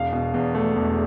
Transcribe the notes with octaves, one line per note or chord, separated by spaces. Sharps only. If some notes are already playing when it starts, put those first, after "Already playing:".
Already playing: E1 F5
B2
E2
A3
E1